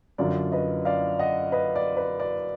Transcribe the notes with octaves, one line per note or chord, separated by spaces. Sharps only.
F#2 D3 F#3 D4 F4 D5
B4 D#5
D5 F5
D#5 F#5
B4 D#5
D5
B4
D5